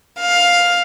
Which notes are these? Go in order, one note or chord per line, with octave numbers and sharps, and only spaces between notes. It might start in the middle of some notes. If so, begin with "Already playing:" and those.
F5